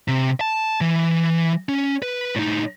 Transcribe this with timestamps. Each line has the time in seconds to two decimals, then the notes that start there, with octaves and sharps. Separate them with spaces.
0.08 C3
0.41 A5
0.81 E3
1.69 C#4
2.02 B4
2.36 A2 D#4